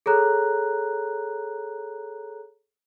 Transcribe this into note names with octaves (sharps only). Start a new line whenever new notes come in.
G#4 A4 C#5 A#5 F#6